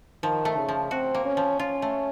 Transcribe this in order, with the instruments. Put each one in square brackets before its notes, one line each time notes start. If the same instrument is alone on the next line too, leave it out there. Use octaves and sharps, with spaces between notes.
[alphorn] D#3 [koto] F3
[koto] A3
[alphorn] C#3
[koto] F3
[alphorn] C4 [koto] F#4
[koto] A#3
[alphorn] C#4
[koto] F3
[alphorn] C#4 [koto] F4
[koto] A3